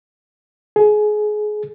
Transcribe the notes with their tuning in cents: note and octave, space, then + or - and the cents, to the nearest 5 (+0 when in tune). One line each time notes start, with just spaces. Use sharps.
G#4 +25